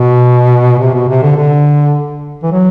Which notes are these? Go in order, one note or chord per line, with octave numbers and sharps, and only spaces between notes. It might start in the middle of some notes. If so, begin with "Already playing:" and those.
Already playing: B2
C3
B2
C3
D3
D3
E3
F#3